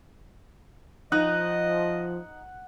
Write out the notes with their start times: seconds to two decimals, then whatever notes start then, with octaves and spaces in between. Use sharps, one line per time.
1.12 F3 D#4 D#5 F#5